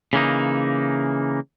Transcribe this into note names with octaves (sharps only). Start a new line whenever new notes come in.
C#3 E3 A#3 D#4